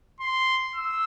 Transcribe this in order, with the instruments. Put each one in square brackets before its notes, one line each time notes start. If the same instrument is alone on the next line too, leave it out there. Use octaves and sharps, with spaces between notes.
[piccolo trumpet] C6
E6